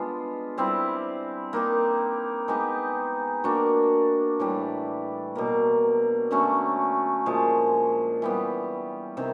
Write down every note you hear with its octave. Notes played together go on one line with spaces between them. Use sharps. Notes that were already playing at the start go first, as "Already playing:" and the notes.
Already playing: G#3 B3 D4 F4
G3 C4 E4
A#3 D#4 G4
G#3 B3 D#4 G4
A#3 D4 F#4
A2 E3 G3
B2 F#3 A#3
D3 F#3 A3 C#4
A#2 F3 G#3
E3 G3 B3
C3 D#3